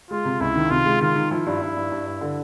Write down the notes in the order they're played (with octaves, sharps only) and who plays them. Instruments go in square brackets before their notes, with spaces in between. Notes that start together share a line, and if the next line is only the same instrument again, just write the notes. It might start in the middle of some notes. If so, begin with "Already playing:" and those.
[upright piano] G#3 [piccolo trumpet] F4
[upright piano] C3
[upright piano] C#2 [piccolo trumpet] E4
[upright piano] D#3
[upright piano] C3 [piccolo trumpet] F4
[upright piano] G#3
[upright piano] D#3 [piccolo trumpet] F4
[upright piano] D#3
[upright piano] F3 [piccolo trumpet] E4
[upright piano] G2
G2
G2
G2
G2
D3